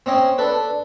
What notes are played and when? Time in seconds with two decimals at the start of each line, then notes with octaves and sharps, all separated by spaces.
0.06 C4 C#4 D#5 G#5
0.38 D4 A4 B4